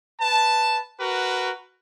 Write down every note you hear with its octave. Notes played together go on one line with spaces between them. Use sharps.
B4 A5
F#4 A#4 B4